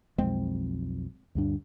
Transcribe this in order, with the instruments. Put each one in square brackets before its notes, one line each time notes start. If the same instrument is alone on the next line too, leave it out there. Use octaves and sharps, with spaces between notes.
[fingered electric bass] B1 F2 [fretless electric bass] G#3 C4
[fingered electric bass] D2 G2 D4